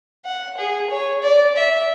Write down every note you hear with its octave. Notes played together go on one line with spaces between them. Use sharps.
F#5
G#4
C#5
D5
E5